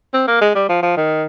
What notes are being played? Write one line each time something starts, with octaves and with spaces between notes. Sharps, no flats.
C4
A#3
G#3
G3
F3
F3
D#3